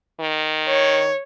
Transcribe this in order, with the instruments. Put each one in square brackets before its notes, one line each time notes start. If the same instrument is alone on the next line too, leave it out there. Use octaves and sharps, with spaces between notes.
[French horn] D#3
[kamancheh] C#5